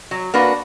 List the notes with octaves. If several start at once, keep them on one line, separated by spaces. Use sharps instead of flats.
F#3
A#3 D4 F#4 B4